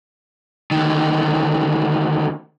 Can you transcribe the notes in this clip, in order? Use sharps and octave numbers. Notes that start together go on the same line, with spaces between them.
D2 D#3